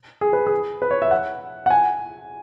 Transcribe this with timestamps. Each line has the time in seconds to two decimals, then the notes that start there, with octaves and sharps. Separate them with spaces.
0.21 G#4
0.33 B4
0.47 G#4
0.82 B4
0.91 C#5
1.02 E5
1.11 F#5
1.66 F#5
1.70 G#5